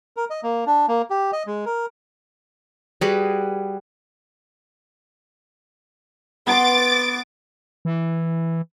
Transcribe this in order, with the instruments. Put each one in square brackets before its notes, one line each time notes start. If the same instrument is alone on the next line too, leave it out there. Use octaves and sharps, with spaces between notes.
[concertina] A#4
D#5
A#3
D4
A#3
G4
D#5
G#3
A#4
[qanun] G3 F#4 G#4 B4
[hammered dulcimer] B3 B4 C6 [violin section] D6 A6
[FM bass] E3